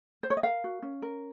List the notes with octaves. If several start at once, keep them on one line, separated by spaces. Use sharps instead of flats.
C5
C#5
D#5
A#4 F5
F#4
C#4
A#4